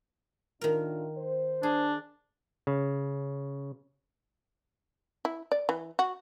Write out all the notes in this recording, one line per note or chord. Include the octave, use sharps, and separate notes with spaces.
A2 D#3 D4 F4 A#4
C5
D4 G#4
C#3
E4
D5
E3
F#4